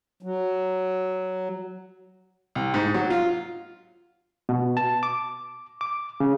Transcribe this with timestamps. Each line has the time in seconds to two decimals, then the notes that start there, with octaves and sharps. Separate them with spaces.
0.23 F#3
2.55 C2
2.74 G#2
2.94 F#3
3.10 F4
4.49 B2
4.77 A5
5.03 D6
5.81 D6
6.20 C#3